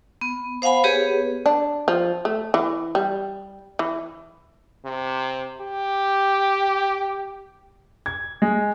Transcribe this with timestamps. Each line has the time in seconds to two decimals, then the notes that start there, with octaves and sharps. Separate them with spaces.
0.21 B3
0.62 C5 F5 F#5 G#5 B5
0.84 B3 G4 G#4 B4 C#5
1.46 D4
1.88 F3
2.25 A3
2.54 E3
2.95 G3
3.79 E3
4.85 C3
5.61 G4
8.06 G#6
8.42 G#3